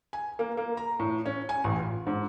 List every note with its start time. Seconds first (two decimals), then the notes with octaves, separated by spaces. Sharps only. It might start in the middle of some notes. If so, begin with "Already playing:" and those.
0.13 G#5
0.39 A#3
0.57 A#3
0.77 A#5
1.00 A2
1.26 C#4
1.49 G#5
1.64 A1
1.79 F4
2.07 G#2